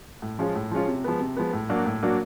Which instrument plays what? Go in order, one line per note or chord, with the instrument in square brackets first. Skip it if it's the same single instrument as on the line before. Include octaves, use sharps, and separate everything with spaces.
[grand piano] A2
F3 G#3 C#4 F4
A2
F3 G#3 C#4 F4
C3
F3 G#3 B3
C3
F3 G#3 B3
A2
F#3 A#3 D4 F#4
A2
F#3 A#3 D4 F#4